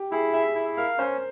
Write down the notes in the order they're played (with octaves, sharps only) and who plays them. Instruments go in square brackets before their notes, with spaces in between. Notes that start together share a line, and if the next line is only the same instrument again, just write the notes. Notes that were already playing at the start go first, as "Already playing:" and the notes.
Already playing: [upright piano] G4
[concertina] E4 [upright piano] G#4
[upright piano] G#4 [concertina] E5
[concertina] E4
[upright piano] A#4 [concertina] F5
[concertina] C#4 [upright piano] C5